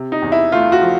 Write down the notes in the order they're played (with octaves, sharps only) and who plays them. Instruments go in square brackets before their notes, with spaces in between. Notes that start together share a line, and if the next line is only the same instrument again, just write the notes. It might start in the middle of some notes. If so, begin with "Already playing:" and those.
Already playing: [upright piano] C3
D#4
E2
E4
A3 F4
F#4
F3